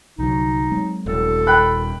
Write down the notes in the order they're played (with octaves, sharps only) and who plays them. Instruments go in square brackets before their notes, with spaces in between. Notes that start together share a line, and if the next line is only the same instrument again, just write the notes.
[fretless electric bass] C2 D3 F#3 [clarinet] D#4
[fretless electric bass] F#3 G#3 C4
[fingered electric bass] D#1 [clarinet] A4
[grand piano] G5 B5 F#6